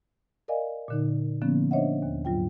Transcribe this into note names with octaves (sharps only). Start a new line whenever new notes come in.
A#4 D5 D#5 F5 G#5
A#2 D3 D#4
D3 F3 A#3 B3 C#4
D4 C5 C#5 D#5 E5 F#5
D#2
G#2 F#3 F4 G5